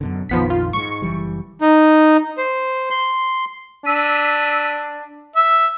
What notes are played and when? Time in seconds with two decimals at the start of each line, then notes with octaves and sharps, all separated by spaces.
0.01 F#2 B2 D3
0.29 A#1 F2 D#3 F3 B3 B6
0.50 F4
0.73 G#2 G#3 C#6
1.02 F#1 E3 G3
1.61 D#4
2.38 C5
2.90 C6
3.85 D4 E6 B6 D#7
5.36 E5